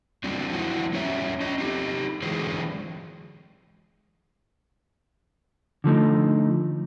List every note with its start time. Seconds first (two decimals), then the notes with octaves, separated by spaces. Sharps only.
0.24 F#3 G3 C4 D4
0.52 F3 G#3 E4 F#4 C5 F#5
0.93 G3 C#4 C#5 E5
1.40 C#4 D#5
1.58 C4 D#4 G4
2.22 D3 E3 F#3 G#3 G#4 C5
5.84 D3 F3 A3 D#4